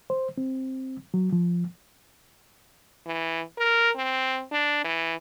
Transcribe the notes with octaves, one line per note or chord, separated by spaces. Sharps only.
C5
C4
F#3
F3
E3
A#4
C4
D4
E3